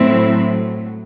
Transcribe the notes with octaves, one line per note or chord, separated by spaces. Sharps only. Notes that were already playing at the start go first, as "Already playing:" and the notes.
Already playing: A2 F#3 C4 E4